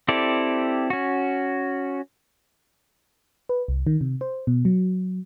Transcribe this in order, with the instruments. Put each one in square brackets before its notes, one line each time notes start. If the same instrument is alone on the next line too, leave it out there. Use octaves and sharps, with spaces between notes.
[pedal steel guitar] C4 E4 G4 A4 D5
C#4 F#4
[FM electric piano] B4
C2
D#3
C3
C5
B2
F#3